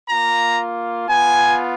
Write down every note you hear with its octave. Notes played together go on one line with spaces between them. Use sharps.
A#3 F4 A#5
B3 F4 G#5